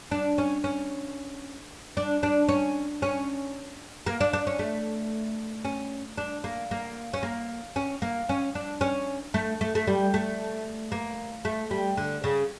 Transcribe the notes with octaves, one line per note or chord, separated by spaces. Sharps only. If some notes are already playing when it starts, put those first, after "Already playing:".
D4
C#4
C#4
D4
D4
C#4
C#4
A#3
D4
D4
C#4
A3
C#4
D4
A#3
A#3
C#4
A#3
C#4
A#3
C#4
D4
C#4
A3
A3
A3
G3
A3
A#3
A3
G3
D3
C#3